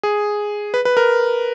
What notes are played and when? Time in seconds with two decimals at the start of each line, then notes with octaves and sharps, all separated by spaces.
0.03 G#4
0.74 B4
0.85 B4
0.97 A#4